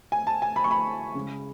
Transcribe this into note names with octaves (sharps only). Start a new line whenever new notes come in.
G#5
A5
G#5
B5
C#6
B5
C#3 G#3